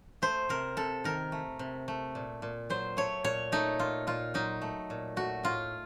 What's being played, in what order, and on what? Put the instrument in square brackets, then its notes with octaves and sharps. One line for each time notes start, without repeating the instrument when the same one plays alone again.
[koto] A3 C5
C3 A#4
C3 A4
D#3 A#4
A3
C3
A3
A#2
A#2
F#3 C5
A3 C#5
A#2 C#5
A3 D#4
A#2 F4
A#2 F4
F#3 D#4
A3
A#2
A3 F#4
A2 F4